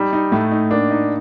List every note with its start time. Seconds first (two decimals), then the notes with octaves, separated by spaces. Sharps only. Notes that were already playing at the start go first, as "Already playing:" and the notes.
Already playing: G3 D#4
0.13 D#4
0.32 A2 A3
0.51 D#4
0.71 A#3 D4
0.91 D#4